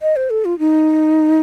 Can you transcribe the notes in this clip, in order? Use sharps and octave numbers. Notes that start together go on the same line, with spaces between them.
D#5
C5
A4
F4
D#4